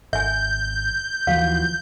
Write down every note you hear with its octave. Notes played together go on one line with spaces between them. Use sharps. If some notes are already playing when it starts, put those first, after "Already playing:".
G#1 E5 G#5 G6
D#2 E3 F3 F#4 F5